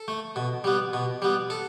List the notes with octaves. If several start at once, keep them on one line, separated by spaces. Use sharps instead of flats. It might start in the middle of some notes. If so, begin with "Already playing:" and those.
Already playing: A4
A3
B2
G3 B3
B2
G3 B3
A4